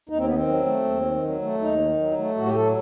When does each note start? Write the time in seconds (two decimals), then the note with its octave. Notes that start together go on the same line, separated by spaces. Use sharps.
0.09 D#2 D#4
0.17 C4
0.26 D#3 B3
0.35 C4
0.47 F#3
0.66 A3
0.84 D#2
1.04 D#3
1.23 F#3
1.42 A3
1.61 D#2 D#4
1.79 D#3
1.99 F#3
2.18 A3
2.36 A2 F#4
2.46 G4
2.55 F#3 A4